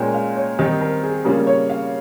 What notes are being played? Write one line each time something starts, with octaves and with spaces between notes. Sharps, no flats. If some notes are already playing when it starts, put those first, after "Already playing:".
Already playing: A#2 G#3 C#4 G5
F5
C#5
D#3 G3 C4 D#4 C5
A#4
G#4
C#3 G3 A#3 F4 A#4
C#5
F5